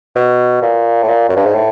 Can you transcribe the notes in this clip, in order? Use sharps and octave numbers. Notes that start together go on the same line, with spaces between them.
B2
A#2
A2
A#2
F#2
G2
G#2
A2